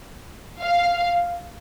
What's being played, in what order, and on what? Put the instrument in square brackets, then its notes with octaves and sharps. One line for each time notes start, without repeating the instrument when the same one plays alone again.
[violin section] F5